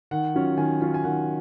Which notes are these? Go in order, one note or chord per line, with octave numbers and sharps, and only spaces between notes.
D#3 F#5
F#3 C#4 F4
D#3 G#5
F#3 C#4 F4
G#5
D#3 F#5